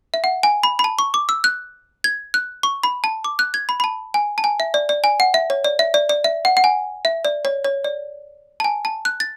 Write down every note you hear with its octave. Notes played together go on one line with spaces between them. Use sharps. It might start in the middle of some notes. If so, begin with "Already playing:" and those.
E5
F#5
G#5
B5
B5
A5
C#6
D6
E6
F#6
G#6
F#6
C#6
B5
A5
D6
F#6
G#6
B5
B5
A5
G#5
A5
G#5
E5
D5
D5
G#5
F#5
E5
C#5
D5
E5
D5
D5
E5
F#5
F#5
G#5
E5
D5
C#5
C#5
D5
A5
G#5
A5
F#6
A6